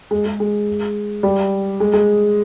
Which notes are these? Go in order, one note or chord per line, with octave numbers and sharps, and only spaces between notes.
G#3
G#3
G#3
G3
G#3
G#3